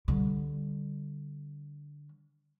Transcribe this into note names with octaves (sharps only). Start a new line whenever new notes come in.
D3 G3